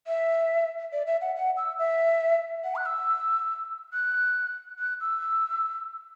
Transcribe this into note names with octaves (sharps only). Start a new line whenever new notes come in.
E5
D5
E5
F#5
F#5
E6
E5
F#5
F#6
E6
F#6
F#6
E6